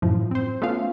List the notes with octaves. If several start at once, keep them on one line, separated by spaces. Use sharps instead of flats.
F#2 A2 E3 F3
C4 C5
A3 B3 C#4 F4 F5